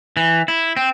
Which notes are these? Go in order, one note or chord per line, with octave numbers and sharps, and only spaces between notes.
E3
E4
C4